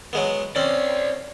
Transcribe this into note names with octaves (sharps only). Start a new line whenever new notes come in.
F#3 G#3 B3
C4 C#4 C5 D5